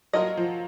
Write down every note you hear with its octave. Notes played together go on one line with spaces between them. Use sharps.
F#3 A#3 F4 A#4 D#5
F3